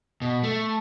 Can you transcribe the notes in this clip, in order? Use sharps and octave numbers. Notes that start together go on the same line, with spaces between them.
B2
A3